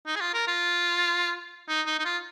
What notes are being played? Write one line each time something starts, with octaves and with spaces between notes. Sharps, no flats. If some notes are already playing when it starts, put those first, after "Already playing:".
D#4
G#4
F4
A#4
F4
D#4
D#4
D#4
F4